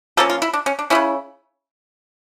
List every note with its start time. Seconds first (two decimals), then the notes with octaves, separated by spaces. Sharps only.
0.17 F3 A#3 C#4 A4
0.30 F4
0.42 E4
0.53 D4
0.66 C#4
0.79 D4
0.90 F3 C#4 E4
0.95 C#3